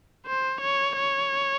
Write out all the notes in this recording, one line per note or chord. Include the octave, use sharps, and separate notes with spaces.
C5
C#5
C#5